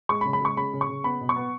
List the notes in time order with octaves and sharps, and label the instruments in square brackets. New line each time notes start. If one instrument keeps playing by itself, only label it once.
[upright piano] G#3 C#6
B5
C#3
B5
G#3 C#6
C#3 B5
C#3
C#6
C#3
B3 B5
B2
C#6
B3